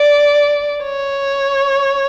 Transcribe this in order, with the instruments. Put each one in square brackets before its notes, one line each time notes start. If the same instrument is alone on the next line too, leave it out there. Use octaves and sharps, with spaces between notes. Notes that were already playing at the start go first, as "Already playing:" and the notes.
Already playing: [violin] D5
C#5